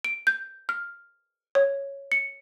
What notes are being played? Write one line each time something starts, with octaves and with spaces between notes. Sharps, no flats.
D7
G6
F6
C#5
C#7